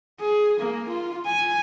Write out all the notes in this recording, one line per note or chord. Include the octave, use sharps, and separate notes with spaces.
G#4
A#3
F4
G#5